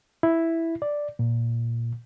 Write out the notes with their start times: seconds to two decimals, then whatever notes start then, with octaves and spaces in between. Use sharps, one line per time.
0.23 E4
0.82 D5
1.19 A#2